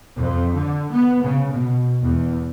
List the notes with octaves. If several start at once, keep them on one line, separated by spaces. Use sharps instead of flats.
F2
D3
B3
C#3
B2
E2